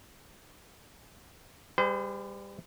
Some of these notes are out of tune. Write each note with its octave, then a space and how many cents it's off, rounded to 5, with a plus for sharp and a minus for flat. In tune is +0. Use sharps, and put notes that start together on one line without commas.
G3 +20 G#4 +0 C5 -40